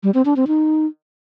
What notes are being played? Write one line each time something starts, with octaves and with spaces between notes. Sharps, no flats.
G3
C4
D4
C4
D#4